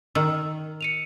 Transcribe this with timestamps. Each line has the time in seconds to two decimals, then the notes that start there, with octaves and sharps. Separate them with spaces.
0.15 D#3 E6
0.81 C#7 D#7 F7